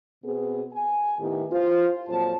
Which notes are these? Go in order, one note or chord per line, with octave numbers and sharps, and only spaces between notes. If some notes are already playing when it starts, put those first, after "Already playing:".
B2 B3 C4 G#4
G#5
A2 D#3 B3 E4 G4
F4 C5
F2 A#2 F#3 C5 A5